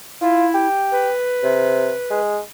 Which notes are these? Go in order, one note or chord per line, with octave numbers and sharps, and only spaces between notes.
E4 F4
G4
B4
C3
G#3